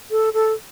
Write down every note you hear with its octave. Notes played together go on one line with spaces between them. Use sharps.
A4
A4